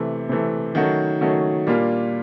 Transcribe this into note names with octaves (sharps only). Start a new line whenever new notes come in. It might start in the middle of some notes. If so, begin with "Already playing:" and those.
Already playing: C3 E3 A3
C3 E3 A3
D#3 F#3 A3 C#4 F#4
D#3 F#3 A3 C#4 F#4
A#2 G3 A#3 D4 F4